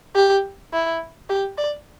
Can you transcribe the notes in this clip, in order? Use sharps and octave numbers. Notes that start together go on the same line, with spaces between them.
G4
E4
G4
D5